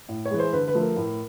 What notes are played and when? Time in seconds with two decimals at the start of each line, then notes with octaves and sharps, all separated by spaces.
0.09 A2
0.25 C#5
0.31 E3 G#3
0.39 C5
0.53 D3 B4
0.68 B4
0.75 F3 A3
0.82 A#4
0.97 A2